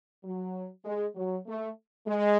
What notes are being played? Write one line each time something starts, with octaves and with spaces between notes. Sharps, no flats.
F#3
G#3
F#3
A3
G#3